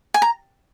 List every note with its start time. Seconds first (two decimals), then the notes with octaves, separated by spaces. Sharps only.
0.14 G#5
0.22 A#5